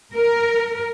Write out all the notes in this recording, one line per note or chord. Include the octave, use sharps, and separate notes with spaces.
A#4